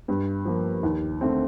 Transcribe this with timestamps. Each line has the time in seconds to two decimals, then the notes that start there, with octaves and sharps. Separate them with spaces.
0.08 G2
0.45 F3 A#3
0.83 D#2
1.21 D3 A3 C4